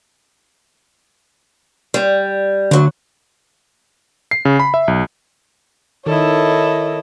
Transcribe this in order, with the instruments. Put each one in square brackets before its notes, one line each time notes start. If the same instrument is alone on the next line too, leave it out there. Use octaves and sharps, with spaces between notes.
[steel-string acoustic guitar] G3
[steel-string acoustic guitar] D2 F#3 [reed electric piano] D3
[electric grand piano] C7
C#3
B5
E5
B1
[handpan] D#3 [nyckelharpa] E4 A4 [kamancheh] C#5 D#5